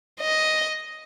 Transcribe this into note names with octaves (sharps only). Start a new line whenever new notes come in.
D#5